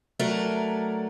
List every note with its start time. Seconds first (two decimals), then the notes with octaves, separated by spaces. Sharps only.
0.19 F#3 A3 D4 A#4